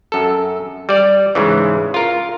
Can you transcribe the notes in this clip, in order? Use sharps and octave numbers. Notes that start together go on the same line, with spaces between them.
F#2 A4
G3 D5
G#2 C#3 E3
F4 A#4